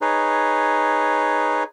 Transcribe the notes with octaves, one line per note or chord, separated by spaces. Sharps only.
D#4 G#4 B4 C#5